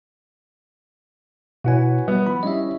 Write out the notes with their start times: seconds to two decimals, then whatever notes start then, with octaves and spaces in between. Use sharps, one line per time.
1.64 B2 E4 F#4 B4 C#5 G#5
2.08 G3 B3
2.27 F3 B5
2.43 G3 C#4 E4 D#5 E5